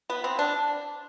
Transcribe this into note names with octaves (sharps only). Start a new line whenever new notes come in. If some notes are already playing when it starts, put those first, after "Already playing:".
B3
C4
D4